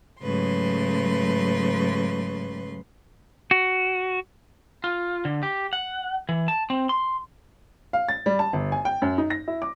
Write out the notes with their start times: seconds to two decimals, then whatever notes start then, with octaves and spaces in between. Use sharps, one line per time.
0.23 G#2 C#3 F#3 A3 B4 C6
3.51 F#4
4.84 F4
5.25 D3
5.43 G4
5.73 F#5
6.29 E3
6.48 A5
6.70 C4
6.89 C6
7.93 F5
8.09 A6
8.26 G3
8.39 A5
8.53 G1
8.72 G#5
8.85 G5
9.02 F#2
9.18 D#4
9.30 A#6
9.48 E4
9.62 D6